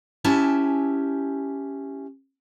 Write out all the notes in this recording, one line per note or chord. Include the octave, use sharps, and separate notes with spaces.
C#4 E4 G4 G#5 A5